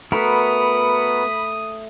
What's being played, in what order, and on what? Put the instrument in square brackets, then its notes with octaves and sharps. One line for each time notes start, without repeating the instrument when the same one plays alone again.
[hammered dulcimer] A3 [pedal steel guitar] B3 F#4 A#4 [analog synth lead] B5 [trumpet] D#6